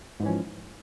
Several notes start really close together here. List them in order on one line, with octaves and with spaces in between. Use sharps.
G#2 E3 C#4 F3